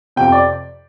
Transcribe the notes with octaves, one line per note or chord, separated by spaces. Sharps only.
F2 C3 G5
D5